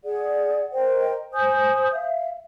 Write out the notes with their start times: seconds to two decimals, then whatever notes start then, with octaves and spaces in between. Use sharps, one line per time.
0.04 G#4 D5 F#5
0.73 A#4 C5 D#5 G5
1.33 C5 G#5 D#6 G6
1.92 E5 F5